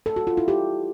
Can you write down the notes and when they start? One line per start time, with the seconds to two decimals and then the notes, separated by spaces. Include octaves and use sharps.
0.06 A4
0.16 F#4
0.27 F4
0.37 E4
0.48 G4